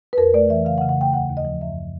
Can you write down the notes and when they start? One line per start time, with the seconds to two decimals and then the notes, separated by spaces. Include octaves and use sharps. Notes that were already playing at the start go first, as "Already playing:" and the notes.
0.13 B4
0.18 F2 A#4
0.33 A3 D5
0.49 E3 E5
0.65 C#3 F5
0.78 F#5
0.82 C#3
0.89 F#5
0.97 A3 G5
1.13 D#2 F#5
1.30 D#2
1.37 D#5
1.45 F3
1.61 F#2 E5